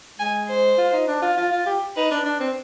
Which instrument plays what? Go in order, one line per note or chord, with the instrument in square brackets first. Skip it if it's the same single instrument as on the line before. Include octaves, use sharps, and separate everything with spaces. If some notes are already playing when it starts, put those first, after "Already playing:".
[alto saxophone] G#3 [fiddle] G#5
[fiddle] C5
[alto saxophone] F4
D#4
D4
F4
F4
F4
G4
[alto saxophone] D#4 [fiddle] B4
[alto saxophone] D4
D4
C4